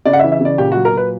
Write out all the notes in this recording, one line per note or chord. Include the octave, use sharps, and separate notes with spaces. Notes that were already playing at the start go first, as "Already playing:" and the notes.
C#3 D5
F#5
E5
E3
E5
C#3
D5
A#2 G4
F#4
F#3
A#4
A#2 B4